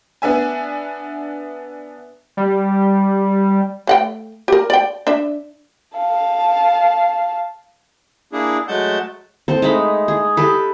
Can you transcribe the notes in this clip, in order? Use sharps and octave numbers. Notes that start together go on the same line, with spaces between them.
B3 D4 E5 G#5
G3
A3 F#5 G5
G4 A#4
D5 G5
D4 E5
F5 A5
A#3 D4 E4 G#4
F#3 G#3 A3 F#5 A5 G6
C4 A4 C5
G#3 A3 D#4 B5
G#4
G4 A4 B4